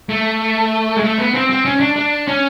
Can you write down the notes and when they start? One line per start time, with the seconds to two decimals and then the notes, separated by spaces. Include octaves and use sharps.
0.09 A3
0.96 G#3
1.03 A3
1.18 B3
1.35 C4
1.50 C4
1.65 C#4
1.80 D4
1.96 D4
2.28 C#4